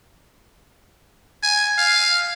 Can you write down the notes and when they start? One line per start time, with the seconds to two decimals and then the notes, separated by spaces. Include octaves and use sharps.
1.43 G#5
1.78 F5